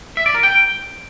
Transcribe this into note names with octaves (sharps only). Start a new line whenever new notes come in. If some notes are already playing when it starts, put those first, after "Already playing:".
E5
D5
A#4
G5